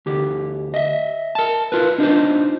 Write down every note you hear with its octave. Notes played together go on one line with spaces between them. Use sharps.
D2 G4
D#5 E5
A#4 A5
F4 A#4 B4
D4 D#4 F4 C5